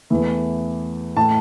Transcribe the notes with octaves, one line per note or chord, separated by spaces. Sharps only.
E2 E3 A3
A2 A3 A5